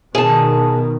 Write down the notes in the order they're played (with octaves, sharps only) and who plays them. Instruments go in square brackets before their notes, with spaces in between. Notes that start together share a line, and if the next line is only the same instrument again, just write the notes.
[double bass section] B2 D#3 [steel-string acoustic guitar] G#4 A5